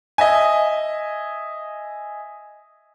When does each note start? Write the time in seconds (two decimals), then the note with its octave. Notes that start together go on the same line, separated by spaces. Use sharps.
0.18 D#5 E5 G#5